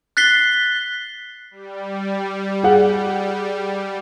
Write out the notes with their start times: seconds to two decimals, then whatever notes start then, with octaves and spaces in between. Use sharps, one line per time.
0.17 F#6 A6 B6 C7 G7
1.51 G3
2.63 G#4 F#5